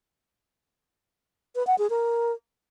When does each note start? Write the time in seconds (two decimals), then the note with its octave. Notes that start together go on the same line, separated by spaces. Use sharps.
1.56 B4
1.67 F#5
1.78 G#4
1.90 A#4